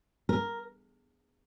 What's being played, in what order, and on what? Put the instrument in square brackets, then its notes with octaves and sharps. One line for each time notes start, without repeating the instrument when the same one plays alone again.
[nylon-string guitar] A#4